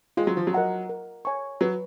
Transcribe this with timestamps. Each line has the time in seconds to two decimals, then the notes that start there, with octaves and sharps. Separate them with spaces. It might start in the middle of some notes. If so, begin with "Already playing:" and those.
0.17 G#3 F4
0.27 F#3
0.37 F3
0.47 F#3
0.53 A#4 D#5 F#5 A#5
0.90 A#4
1.25 C#5 G#5 C#6
1.61 F#3 B4